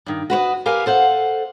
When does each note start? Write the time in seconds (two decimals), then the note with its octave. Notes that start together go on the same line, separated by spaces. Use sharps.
0.06 G2 D#3
0.30 F#4 B4 C#5 D#5
0.66 G4 A#4 B4 F5 G#5
0.86 A4 C5 F5 F#5